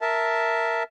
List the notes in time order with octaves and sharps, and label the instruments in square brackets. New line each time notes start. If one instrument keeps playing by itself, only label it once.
[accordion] A#4 E5 A5